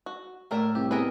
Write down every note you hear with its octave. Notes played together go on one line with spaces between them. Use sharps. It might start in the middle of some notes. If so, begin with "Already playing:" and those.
F#4
A2 A#3 A#4 D5 E6
C2 G4
B3 C4 G#4 A#4 B4 D#5